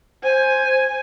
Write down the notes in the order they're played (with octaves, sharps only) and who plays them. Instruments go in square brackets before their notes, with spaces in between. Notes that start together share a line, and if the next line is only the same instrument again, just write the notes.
[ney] C5 [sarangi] G#5